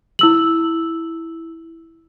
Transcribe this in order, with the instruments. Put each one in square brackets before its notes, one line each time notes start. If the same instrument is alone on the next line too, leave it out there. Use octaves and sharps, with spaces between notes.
[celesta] E4 E6 F#7